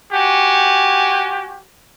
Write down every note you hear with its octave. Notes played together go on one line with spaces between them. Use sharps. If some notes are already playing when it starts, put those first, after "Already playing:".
F#4 G4 F#5 G#5